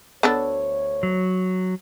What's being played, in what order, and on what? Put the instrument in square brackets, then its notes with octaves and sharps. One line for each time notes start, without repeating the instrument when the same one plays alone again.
[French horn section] D2 C#5 [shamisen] B3 D4 A4
[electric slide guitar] F#3